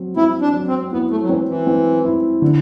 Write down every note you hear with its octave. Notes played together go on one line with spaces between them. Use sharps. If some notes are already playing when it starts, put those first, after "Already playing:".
Already playing: F#3 C4
C4 E4
D4
F#3
C4
B3 E4
A3
F#3
E3 C4
E3
C4
E4
D3